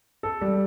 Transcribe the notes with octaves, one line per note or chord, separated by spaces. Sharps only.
A4
G3